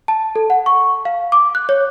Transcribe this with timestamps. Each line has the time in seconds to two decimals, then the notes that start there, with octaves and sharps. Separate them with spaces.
0.08 A5
0.36 A4
0.50 F#5
0.66 C#6
1.05 F5
1.32 D6
1.55 F#6
1.69 C#5